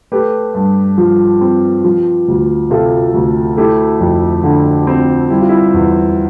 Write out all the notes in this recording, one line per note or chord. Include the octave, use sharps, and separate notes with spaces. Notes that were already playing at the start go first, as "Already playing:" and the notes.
A3 G4 B4
G2
F3
C4
F3
D2
C3 F4 A4
D2
A3 E4 G4
F2
D3
C4
G3 E4
F4
E4
E2